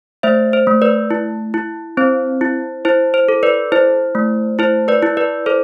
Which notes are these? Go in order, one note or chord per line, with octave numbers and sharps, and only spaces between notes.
A3 C5 E5
C5
A3
B4 D5
E4
E4
C4 C5
E4
E4 C5
C5
A4
B4 D5
E4 C5
A3
E4 C5
B4 D5
E4
B4 D5
A4 C5